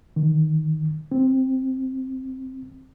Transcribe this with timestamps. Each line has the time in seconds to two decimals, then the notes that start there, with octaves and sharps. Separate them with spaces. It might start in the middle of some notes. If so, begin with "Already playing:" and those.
0.16 D#3
1.12 C4